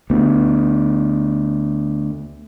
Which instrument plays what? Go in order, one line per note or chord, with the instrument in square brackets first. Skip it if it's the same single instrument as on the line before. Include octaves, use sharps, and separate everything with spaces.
[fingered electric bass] D2 B3